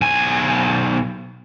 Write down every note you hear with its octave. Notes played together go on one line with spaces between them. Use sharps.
B1 G#5